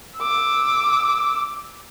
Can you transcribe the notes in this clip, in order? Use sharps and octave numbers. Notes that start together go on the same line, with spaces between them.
D6 E6